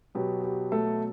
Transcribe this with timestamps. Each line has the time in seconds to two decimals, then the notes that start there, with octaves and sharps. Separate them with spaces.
0.15 B2 F#3 B3 G4
0.44 G4
0.72 A3 A4